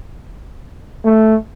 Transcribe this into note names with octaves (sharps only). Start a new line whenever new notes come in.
A3